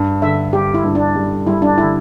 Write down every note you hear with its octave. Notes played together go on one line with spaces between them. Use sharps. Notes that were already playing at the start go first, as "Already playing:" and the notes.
Already playing: G2
D3 E5
G3 G4
E4
G2
D4
G3
G3 E4
D4
D3 E4